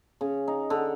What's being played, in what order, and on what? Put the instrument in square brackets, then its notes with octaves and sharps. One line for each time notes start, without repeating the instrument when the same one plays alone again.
[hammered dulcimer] C#3
D#4
D3